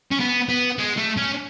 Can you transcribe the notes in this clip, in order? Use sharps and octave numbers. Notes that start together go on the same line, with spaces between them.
C#4
B3
B3
G#3
A3
C#4